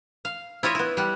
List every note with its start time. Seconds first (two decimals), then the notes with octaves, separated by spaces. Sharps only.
0.25 F5
0.63 E4 F4 C#5 D#5 E5
0.75 B3 E4
0.97 G3 F#5